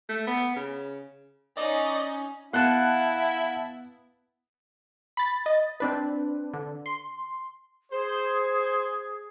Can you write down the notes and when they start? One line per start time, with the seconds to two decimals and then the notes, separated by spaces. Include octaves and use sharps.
0.09 A3
0.27 B3
0.56 C#3
1.57 C#4 D#4 D5 D#5
2.53 B3 E4 F5 F#5 A5 F#6
5.17 B5 A6
5.45 D#5 A6
5.80 C4 D4 B4
6.54 D3
6.86 C6
7.92 G#4 C5